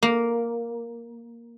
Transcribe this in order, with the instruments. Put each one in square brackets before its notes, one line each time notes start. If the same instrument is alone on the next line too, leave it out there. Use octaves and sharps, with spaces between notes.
[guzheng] A#3